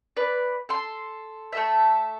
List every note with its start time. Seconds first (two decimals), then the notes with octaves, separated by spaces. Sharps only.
0.17 B4 D5
0.69 A4 C6
1.52 A3 A4 E5